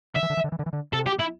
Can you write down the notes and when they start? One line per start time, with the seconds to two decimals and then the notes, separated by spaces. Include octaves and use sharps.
0.16 D3 E5
0.23 E3
0.30 D3
0.37 E3
0.44 D3
0.52 E3
0.59 D3
0.66 E3
0.73 D3
0.93 C3 A4
1.06 G4
1.19 E4